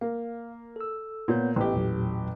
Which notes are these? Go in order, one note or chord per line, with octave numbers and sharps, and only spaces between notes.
A#3 F5
A4 E6
A#2 B3 C#5 G6
A1 B3 G4 D#5
E2 A#2 F#3